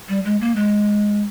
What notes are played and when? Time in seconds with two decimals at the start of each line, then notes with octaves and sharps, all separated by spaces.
0.09 G3
0.25 G#3
0.41 A#3
0.56 G#3